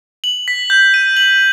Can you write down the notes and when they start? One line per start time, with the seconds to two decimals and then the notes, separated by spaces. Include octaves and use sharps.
0.24 F#7
0.48 B6
0.70 G6
0.94 D#7
1.17 F#7